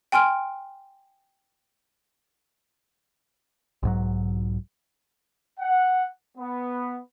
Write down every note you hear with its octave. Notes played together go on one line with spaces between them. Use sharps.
G5 G#5 C6 F6 D7
B1 G#2 F#3
F#5
B3